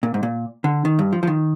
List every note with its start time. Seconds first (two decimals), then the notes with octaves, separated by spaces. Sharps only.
0.03 A#2
0.14 G#2
0.23 A#2
0.64 D3
0.85 D#3
0.99 G2
1.13 F3
1.23 F3
1.27 D#3